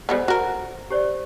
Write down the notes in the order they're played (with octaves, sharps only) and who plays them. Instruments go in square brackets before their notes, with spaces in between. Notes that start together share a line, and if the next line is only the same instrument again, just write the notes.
[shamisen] G3 G#3 B3 [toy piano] F4 A4 C5
[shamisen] F#4 A#4
[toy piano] G4 C5 D5